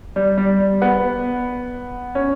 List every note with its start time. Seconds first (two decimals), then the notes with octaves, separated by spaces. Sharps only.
0.16 G3
0.38 G3
0.82 B3
2.15 C#4